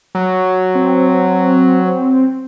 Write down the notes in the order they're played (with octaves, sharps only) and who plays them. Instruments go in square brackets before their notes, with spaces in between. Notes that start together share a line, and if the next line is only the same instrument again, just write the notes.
[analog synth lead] F#3
[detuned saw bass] C4